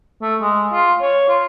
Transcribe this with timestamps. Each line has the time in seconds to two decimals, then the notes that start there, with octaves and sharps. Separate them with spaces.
0.22 A3
0.41 G#3
0.73 F4
1.01 C#5
1.28 F4